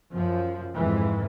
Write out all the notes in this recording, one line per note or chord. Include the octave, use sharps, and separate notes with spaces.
F#2 F3
F2 G#2 E3